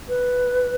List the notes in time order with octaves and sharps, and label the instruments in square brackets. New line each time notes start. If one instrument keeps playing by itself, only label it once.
[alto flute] B4